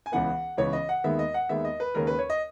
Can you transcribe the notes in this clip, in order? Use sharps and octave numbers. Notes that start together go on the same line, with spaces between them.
G#5
C#2 C#3 E3 B3 F#5
C#2 C#3 E3 B3 C#5
D#5
F#5
D#2 D#3 G#3 B3 E5
D#5
F#5
D#2 D#3 G#3 B3 E5
D#5
B4
D#2 C#3 G#3 C#4 A#4
B4
C#5
D#5